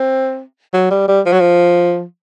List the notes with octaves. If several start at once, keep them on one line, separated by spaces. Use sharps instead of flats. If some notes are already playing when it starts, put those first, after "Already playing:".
Already playing: C4
F#3
G3
G3
F3
F#3
F3